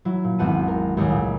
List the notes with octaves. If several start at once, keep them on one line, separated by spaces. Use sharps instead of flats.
F#3 E4
A#2
G#1 E2 C4 F#5 A5 D#7
A#4
G#1 C#2 G4 G#4 C#5
A#2 G#3 A3